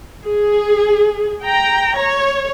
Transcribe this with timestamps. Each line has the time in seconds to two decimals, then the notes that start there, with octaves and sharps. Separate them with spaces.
0.25 G#4
1.42 G5 A#5
1.97 C#5